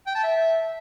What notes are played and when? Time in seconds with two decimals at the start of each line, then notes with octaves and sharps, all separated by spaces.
0.07 G5
0.15 A5
0.24 E5